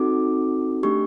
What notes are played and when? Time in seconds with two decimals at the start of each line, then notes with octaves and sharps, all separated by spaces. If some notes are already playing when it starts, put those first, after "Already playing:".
Already playing: C4 D#4 F#4 A4 D6
0.83 A3 D4 G4 C#6